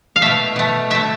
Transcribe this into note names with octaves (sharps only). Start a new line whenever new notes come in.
F5
B2 A3 E5
B2 A3
B2 A3 E5